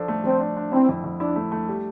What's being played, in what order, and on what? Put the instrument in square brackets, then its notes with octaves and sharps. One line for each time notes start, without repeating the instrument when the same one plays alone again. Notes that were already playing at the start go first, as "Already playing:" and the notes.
Already playing: [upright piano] F3 D4 A4
A3
[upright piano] F3 [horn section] C4
[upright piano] D4
D4
[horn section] C4 [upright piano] E4
[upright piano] F2
F2
[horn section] D4 [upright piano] E4
[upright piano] A3
A3
G3